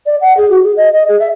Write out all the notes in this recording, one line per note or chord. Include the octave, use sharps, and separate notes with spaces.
D5
F#5
G#4
F#4
G#4
D#5
D#5
G#4
E5